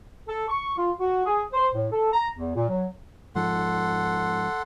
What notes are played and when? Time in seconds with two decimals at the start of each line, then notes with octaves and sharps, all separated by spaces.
0.28 A4
0.48 C#6
0.77 F4
1.00 F#4
1.26 G#4
1.53 C5
1.75 A2
1.92 A4
2.13 A#5
2.37 E2
2.56 A#2
2.69 F#3
3.35 G#2 F3 A4 F#5 C6